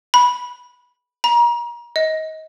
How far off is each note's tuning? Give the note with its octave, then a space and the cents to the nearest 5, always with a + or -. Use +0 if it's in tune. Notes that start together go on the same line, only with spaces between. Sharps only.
B5 -10
A#5 +35
D#5 +25